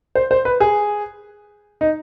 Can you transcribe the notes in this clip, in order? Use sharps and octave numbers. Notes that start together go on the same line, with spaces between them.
C5
C5
B4
G#4
D#4